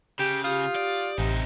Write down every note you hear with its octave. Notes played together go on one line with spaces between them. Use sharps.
C#3 G4
F4 G4 D#6
D5
A1 C3 D#4